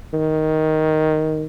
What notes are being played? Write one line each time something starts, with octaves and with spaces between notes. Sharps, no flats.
D#3